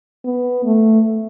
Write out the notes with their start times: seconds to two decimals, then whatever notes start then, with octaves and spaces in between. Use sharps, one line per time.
0.25 B3
0.64 A3